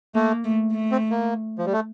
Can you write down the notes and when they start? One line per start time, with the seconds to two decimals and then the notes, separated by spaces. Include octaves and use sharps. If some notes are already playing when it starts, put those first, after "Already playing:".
0.15 A3 A#3
0.44 A3
0.72 A3
0.91 C4
1.11 A#3
1.58 F3
1.66 G3
1.73 A3